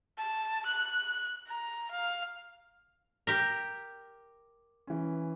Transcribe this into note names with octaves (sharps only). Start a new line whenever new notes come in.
A5
F#6
A#5
F5
G4 A#4
E3 C#4